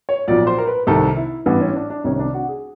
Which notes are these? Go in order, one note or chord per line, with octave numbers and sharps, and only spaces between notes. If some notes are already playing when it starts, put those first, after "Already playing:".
C#5
B1 A#2 F3 D5
C5
A#4
B4
C2 C3 D#3 A4
E4
A1 G2 E3 B3
C#4
D4
D4
C2 C3 D#3 C#4
D4
F#4
G#4